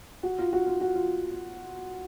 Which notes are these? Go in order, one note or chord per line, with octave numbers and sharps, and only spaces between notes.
F#4
F4
F#4
F4
F#4
F4